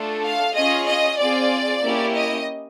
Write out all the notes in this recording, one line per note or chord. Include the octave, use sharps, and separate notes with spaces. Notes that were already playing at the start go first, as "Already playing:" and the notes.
Already playing: A3 D4 F4 A4
F5
C#4 F4 G#4 D#5
D#5
C4 F4 G#4 D5
A#3 C#4 E4 G4
D#5